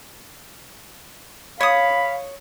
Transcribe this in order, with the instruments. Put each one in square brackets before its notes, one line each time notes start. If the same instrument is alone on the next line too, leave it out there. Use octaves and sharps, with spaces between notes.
[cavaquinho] C#5 D#6 [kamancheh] F5 [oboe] B5